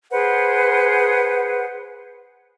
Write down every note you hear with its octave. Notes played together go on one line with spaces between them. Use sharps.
G#4 B4 C5 F#5